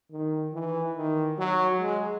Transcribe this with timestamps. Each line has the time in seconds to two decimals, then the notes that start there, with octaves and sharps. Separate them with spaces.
0.12 D#3
0.53 E3
0.96 D#3
1.38 F#3
1.80 G#3